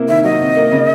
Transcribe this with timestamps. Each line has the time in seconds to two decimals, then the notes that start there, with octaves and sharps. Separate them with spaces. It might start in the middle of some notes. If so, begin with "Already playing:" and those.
Already playing: C3 A#3 E4
0.08 D#3 E5
0.24 F#3 D#5
0.41 C3
0.57 A#3
0.72 C#3